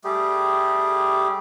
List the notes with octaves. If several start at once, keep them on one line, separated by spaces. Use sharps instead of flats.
G3 A3 G4 G#4